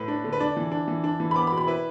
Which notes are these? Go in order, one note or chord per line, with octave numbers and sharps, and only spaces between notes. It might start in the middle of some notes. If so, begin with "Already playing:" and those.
Already playing: A2 B4
D4
D3
B4
D4 D5
E3
D4
E3
D4
E3
B5
B3 D6
B5
B2
B5
E4 B4